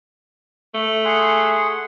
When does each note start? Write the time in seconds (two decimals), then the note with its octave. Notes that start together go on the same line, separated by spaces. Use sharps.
0.74 A3
1.05 G#4 F#5 C6